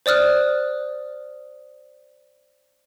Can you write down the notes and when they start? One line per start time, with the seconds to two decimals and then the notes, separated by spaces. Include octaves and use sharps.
0.06 C5 D5 D#6 F6 F#6